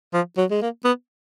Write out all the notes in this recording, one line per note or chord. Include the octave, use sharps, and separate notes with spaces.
F3
F#3
G#3
A#3
B3